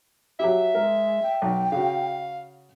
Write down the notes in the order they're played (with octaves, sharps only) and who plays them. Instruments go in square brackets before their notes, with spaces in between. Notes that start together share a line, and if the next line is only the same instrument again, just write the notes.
[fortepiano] F#3 G4 [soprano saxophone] E5
[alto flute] G#3 [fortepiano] A#4
[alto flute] G5
[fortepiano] B1
[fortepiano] C#3 F#4 [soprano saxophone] F5